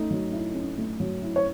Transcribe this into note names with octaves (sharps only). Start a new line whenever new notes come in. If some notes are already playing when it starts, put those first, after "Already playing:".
Already playing: A3 C#4 D#4
F#3
E4
C#4
A3
F#3
E4
C#5